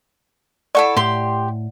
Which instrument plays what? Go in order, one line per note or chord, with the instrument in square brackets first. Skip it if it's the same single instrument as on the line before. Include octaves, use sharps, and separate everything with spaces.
[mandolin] E4 A4 C#6 [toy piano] D5 F#5 A5
[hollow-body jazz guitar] A2 [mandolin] G4 C6